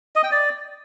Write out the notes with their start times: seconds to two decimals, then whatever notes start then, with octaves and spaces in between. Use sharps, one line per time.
0.16 D#5
0.24 G5
0.32 D5